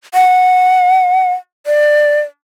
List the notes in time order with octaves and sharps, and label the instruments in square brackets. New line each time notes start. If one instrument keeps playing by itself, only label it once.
[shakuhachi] F#5
D5